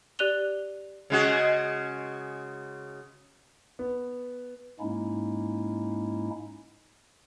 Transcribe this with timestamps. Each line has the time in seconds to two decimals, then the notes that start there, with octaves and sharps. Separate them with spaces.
0.19 G4 D5 F#6 D#7 F7 G7
1.10 C#3 G#3 F#4
3.79 B3
4.80 G#2 G#3 A#3 C#4 D#4 E4